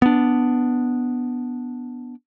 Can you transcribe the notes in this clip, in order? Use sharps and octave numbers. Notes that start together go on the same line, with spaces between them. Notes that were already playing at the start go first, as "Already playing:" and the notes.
B3 D4